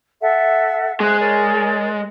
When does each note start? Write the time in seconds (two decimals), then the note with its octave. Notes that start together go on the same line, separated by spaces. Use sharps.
0.21 A4 E5 F#5
1.00 G#3 C5 F#6
1.19 A#4 C#5 D5